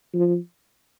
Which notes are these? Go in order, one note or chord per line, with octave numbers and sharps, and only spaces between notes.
F3